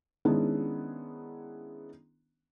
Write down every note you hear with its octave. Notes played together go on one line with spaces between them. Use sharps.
D#3 G#3 B3 C#4 D4 E4